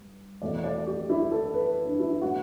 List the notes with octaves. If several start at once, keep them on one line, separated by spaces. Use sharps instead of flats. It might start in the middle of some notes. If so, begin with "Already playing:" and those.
Already playing: G2
E2 B2 A3 D5
D5
G4
E4
A4
B4
D4
E4
B2 A3 F#4